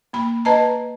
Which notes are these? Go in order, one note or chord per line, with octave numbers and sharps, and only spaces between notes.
A#3 B5
B4 D#5 A5 A#5